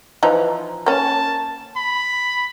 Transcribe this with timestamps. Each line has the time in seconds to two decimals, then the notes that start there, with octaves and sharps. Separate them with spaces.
0.23 E3 F3 D#4
0.86 A#3 C#4 A5
1.76 B5